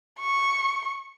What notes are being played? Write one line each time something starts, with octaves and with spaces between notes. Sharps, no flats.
C#6